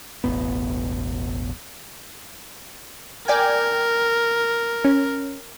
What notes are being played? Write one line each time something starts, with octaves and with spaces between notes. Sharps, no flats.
E1 A1 E2 B3
A#4 D5 G5 G#5
C#4